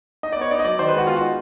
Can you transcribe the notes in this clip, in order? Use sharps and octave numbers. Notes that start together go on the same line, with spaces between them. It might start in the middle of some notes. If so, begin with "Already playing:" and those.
D#4 D#5
D5
B3
C#5
D#4 D5
D#5
F#3 D5
D#3 C5
B4
G#3
F#4
B3 F4
F#4
D#4